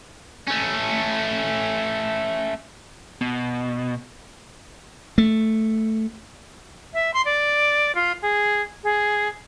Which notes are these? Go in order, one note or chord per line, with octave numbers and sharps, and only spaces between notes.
A3 C#4
B2
A3
E5
C6
D5
F4
G#4
G#4